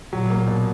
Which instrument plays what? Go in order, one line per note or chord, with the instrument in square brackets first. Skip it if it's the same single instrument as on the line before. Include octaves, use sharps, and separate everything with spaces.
[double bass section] A#2 [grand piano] F#3
[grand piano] A#3
B2